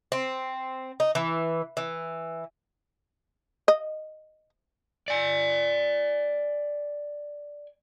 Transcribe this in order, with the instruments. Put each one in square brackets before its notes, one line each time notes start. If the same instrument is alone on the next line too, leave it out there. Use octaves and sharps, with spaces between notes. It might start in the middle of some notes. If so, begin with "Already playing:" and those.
[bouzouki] C4
D#4
E3
E3
[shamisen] D#5
[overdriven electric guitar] D5 G#5